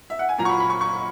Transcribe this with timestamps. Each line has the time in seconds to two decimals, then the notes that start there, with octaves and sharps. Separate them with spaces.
0.10 E5
0.19 F#5
0.29 G#5
0.38 A#2 F#3 A#3 A#5
0.45 C#6
0.49 B5
0.60 B5
0.70 C#6
0.81 C#6